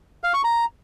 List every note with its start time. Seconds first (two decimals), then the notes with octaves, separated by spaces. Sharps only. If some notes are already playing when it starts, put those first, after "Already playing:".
0.24 F5
0.34 C#6
0.44 A#5